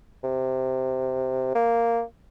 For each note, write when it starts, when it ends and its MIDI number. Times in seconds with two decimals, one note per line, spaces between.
0.23 1.53 48
1.55 2.02 58